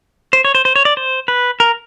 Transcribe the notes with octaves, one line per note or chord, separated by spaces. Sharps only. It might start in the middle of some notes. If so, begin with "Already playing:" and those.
C5
C#5
C5
C5
C#5
D5
C5
B4
A#4